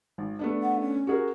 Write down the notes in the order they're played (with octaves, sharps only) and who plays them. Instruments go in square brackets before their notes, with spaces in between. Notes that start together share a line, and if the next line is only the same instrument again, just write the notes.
[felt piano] G#1
A3 B3 D4
[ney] F#5
C#4
[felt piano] F#4 G#4 A#4